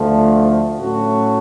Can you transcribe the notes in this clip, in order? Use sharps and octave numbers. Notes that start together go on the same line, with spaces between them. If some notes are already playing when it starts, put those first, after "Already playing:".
Already playing: D2 D3 F3 A3
A2 F#3 A3 C#4 F#4